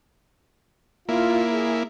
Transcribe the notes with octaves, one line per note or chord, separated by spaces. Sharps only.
A#3 E4 F4
G#4